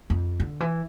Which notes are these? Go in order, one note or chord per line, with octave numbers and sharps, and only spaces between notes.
F2
D3
E3